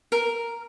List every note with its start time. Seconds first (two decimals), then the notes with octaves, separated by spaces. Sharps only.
0.12 A#4